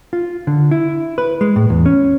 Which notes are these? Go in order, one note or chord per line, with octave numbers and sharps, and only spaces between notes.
F4
D3
E4
B4
G#3
A2
E2
C#4